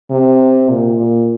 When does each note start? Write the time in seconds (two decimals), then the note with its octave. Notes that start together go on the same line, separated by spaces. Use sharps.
0.11 C3
0.70 A#2
0.98 A#2